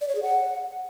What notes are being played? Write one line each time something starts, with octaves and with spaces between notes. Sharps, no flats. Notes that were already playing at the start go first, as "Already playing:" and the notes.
D5
C#5
G#4
F#5